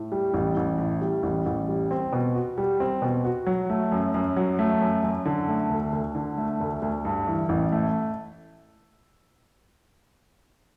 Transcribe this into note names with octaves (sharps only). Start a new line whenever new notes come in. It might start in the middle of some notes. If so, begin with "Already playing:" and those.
Already playing: A2
G3
A1
A1
A2
G3
A1
A1
G3
C4
B2
F#4
G3
C4
B2
F#4
F#3
A3
F#2
F#2
F#3
A3
F#2
F#2
D3
A3
D2
D2
D3
A3
D2
D2
G2
E3
A1
A3